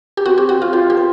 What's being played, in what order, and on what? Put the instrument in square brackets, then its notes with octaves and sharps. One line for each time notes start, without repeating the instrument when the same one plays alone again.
[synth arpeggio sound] G4
[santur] C4 [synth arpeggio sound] F#4
[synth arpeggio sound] G4
[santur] C4 [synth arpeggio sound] F#4
[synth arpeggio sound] F4
[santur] F4 [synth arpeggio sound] G4
[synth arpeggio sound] G4
[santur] C5